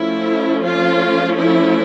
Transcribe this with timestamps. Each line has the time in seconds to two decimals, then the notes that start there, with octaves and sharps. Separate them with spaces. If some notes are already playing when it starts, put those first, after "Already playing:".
Already playing: F3 A3 C#4 E4
0.63 F4
1.37 E4